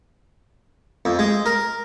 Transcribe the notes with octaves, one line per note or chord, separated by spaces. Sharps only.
F2
G#3
A#4